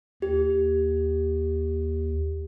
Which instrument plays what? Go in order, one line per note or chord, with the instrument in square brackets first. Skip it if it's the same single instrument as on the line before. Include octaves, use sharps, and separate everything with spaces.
[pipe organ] D#2 [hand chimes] G4